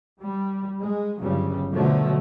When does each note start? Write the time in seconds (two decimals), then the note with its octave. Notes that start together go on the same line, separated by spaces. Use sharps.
0.20 G3
0.81 G#3
1.18 G1 C#3 F#3 G3
1.74 B2 D3 F3 F#3 A3